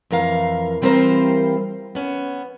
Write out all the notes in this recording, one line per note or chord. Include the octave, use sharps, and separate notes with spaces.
F2 E3 A#4 F5
E3 G3 C4 F4 A#4 C5
B3 C#4